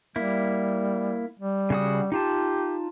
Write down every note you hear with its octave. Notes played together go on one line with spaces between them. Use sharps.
G3 A#3 E4
G3
C#3 F#4 D#6
D#4 F4 G4 A5